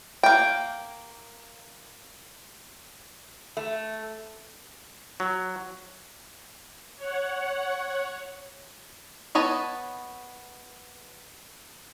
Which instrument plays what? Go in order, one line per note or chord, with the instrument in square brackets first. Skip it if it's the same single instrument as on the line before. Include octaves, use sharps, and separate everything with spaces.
[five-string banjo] A#3 G5
[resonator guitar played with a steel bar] A3
[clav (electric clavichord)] F#3
[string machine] C#5 F#5
[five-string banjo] B3 C#5 D#5 A5